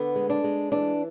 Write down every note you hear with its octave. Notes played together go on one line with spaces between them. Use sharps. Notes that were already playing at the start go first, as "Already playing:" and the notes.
Already playing: D3 B3
G#3
D4
G#3
E3 D4